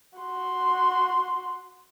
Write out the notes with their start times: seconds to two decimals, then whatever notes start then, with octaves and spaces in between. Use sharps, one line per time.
0.19 F#4 C6